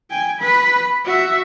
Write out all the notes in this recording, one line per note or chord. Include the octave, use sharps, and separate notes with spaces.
G5 G#5
B4 B5
F#4 E5